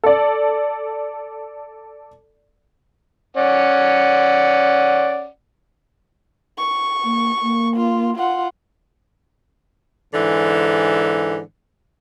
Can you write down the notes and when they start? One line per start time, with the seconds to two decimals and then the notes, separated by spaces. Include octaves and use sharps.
0.04 A4 D5
3.37 C#4 D5 F#5
6.58 C#6
7.05 A#3
7.43 A#3
7.76 F4
8.17 F4 F#5
10.14 G#2 D3 E3